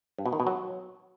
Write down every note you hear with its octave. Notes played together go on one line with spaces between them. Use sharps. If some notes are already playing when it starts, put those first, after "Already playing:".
G2
B2
D#3
B2
F#3